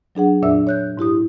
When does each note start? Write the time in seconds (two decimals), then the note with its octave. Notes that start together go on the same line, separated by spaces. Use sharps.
0.15 F#3 D4 G#4 F#5
0.42 F2 A#2 D4 D5 E5 E6
0.67 C#5 F#6 G6
0.97 G#2 E4 G4 D#6